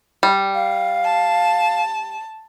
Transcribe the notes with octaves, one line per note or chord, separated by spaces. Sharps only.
G3
F5
A5